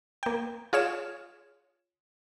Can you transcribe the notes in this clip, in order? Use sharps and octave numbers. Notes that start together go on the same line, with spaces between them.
A#3 G5
F4 G#4 C#5 E7